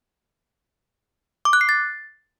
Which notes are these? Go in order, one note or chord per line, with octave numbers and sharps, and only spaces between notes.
D6
F#6
C7
A6